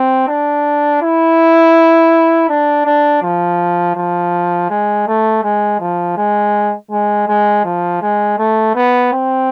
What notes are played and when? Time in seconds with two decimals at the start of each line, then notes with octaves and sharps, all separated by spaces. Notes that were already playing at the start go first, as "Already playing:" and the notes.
Already playing: C4
0.28 D4
1.02 E4
2.49 D4
2.86 D4
3.23 F3
3.96 F3
4.70 G#3
5.07 A3
5.44 G#3
5.80 F3
6.17 G#3
6.91 G#3
7.28 G#3
7.65 F3
8.02 G#3
8.39 A3
8.76 B3
9.13 C4